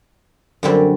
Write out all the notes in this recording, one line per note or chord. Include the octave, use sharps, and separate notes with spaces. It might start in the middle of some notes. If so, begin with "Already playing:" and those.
F#2 D3 G3 C4